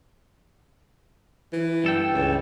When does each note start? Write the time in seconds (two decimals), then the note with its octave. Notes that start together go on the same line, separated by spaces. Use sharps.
1.53 E3
1.84 G2 A4 G5
2.14 C#2